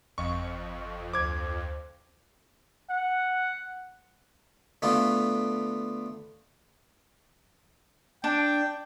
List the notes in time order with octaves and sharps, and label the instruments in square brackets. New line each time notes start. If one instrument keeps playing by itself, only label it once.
[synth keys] G1 D#5 F5 [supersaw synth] F2 [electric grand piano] C#6
[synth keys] D2 C5 [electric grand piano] D6 G#6
[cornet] F#5
[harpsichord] D3 A3 B3 F4
[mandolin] D4 [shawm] G5